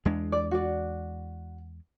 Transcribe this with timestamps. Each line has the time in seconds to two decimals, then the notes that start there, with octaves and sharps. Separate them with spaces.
0.05 E2 G#3 D4
0.32 D5
0.51 F#4 D5